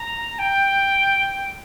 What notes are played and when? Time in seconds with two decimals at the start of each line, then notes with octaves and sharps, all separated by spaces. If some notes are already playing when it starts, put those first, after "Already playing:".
Already playing: A#5
0.39 G5